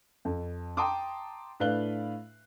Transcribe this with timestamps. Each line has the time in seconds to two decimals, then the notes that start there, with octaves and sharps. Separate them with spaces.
0.25 F2
0.77 G5 A5 A#5 C6 D6 D#6
1.60 A2 D4 B4 F5 F#6 G7